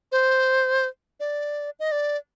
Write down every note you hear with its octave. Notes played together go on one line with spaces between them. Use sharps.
C5
D5
D#5
D5